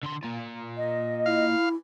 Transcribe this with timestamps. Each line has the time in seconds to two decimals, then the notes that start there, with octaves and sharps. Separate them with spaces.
0.03 D3 C6
0.23 A#3 F4
0.77 D#5
1.26 E4 F5